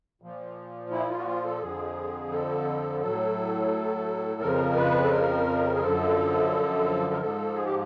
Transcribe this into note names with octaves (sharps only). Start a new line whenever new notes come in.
A#2 F3
E4
F4
F#4
F4
A4
F2 D3 F3 G#4
A4
A2 F#3 A4
F2 C#3 F3 A#4
B4
A4
A#4
G#4
F#2 D3 F3 A4
A#4
G#2 F3 A4
G#4
G4